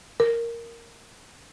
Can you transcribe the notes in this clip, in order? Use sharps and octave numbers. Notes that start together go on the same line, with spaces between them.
A#4